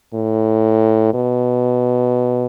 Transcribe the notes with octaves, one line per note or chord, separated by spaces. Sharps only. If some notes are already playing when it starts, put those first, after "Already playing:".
A2
B2